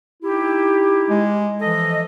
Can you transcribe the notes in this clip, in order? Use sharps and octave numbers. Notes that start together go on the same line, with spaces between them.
D#4 E4 G4
G#3
E3 F3 A4 D#5